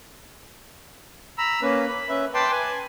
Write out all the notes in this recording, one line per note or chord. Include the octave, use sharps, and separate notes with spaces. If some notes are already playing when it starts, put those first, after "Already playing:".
A#5 B5 E6
A#3 C#4 B4
B5
C#4 B4 E5
B4 G5 A5 C6 D6
B4 G#5